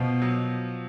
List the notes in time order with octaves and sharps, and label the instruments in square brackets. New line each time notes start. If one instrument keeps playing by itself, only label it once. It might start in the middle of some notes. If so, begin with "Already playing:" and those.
Already playing: [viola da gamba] B2 [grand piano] F3
[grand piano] F#3